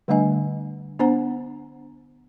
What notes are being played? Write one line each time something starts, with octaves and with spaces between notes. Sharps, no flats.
D3 G3 A3 D4 D#5 G#5
B3 D4 C5 F#5 A#5